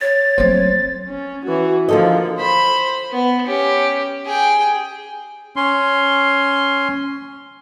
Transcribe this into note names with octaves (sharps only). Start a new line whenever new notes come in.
C#5 A6
F#3 A3 C4 C5
C#4
E3 F#4
D3 F3 A#3 A4 D#5
C5 B5
B3
C#4 G4
G#4 G5
C#4 C6